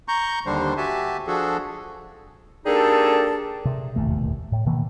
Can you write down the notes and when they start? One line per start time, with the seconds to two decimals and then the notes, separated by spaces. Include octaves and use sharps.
0.08 A#5 C#6 G6
0.46 D#2 D3 G3 D4 C5
0.77 F#4 G4 E5 G#5 A5
1.27 F3 D4 F#4 G#4 A4
2.65 G3 A#3 D4 D#4 G#4 A4
3.65 C3
3.96 E1 A1 D#2 A3
4.52 A2
4.66 B2 D#3 E3 A#3